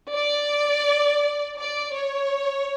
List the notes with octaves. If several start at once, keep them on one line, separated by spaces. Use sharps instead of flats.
D5
D5
C#5